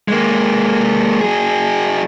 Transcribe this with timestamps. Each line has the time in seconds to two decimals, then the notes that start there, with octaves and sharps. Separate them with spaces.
0.08 G#3 A#3
1.21 F#3 G#4